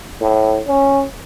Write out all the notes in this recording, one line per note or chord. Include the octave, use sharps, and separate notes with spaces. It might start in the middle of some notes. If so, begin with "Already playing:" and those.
A2
C#4